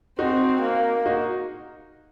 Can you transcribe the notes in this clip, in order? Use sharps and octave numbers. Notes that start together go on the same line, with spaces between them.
C4 D#4 F#4
A#3
D#4 F#4